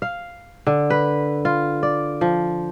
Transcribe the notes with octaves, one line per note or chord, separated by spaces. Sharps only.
F5
D3
B4
F4
D5
F3